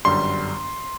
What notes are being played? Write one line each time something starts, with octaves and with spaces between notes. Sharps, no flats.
G1 F#2 D3 G3 C6